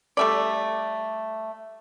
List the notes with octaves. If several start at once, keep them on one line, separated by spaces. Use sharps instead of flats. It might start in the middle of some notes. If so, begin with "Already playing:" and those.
G3 A3 D5